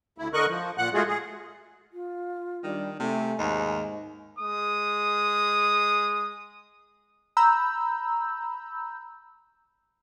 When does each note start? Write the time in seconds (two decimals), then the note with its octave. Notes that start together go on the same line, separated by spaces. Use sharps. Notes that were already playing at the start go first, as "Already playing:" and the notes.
0.18 D2 E4
0.33 D3 A#4 D#5 C#6 F#6
0.49 F3
0.78 A#2 F#5 F#6
0.94 G#3 A3 F4 F#4 G#4
1.08 G#4
1.93 F4
2.63 D#3 G3 D4
3.00 C3 A3 G#5
3.39 D#2 G#2 G#3
4.39 G#3 D#6
7.37 A#5 B5 E6 G6